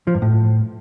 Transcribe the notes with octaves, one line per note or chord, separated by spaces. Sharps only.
F3
G2
A2